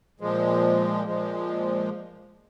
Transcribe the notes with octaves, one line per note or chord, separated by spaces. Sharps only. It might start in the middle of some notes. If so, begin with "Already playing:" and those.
A#2 F3 G#3
A#2 F3 G#3